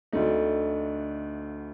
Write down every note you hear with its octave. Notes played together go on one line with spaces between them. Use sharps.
D2 D3 A3 D#4